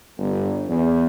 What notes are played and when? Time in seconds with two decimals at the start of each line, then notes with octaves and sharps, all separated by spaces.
0.17 G1
0.68 E2